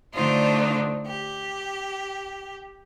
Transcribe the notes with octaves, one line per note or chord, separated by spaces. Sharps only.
D3 A3 D4 D#4 F4 C5
G4